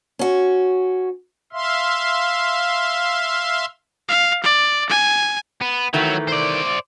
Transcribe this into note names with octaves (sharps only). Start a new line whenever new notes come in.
C#4 F#4
E5 F5 C6
F5
D5
G#5
B3
D#3 E3 F#3 A3
C5 D5